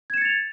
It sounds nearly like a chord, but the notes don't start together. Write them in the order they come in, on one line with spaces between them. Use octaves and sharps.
G#6 E7 C#7 A6 F7